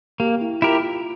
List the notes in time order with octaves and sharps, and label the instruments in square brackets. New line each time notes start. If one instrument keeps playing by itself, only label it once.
[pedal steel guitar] A#3 [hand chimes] G4
[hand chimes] E4
[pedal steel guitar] E4 G4 A#4 [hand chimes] F4
[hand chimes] F4